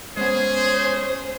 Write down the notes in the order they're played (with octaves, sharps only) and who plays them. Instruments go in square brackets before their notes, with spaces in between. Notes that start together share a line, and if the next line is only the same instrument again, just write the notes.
[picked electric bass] G#3 B3 [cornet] C#4 [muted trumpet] G#4 [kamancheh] C5